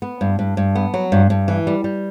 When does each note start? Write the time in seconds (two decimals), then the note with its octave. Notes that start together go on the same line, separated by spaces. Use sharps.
0.02 B3
0.21 G2
0.39 G2
0.57 G2
0.75 B3
0.94 F#3
1.12 G2
1.30 G2
1.48 E3
1.67 G3
1.84 G3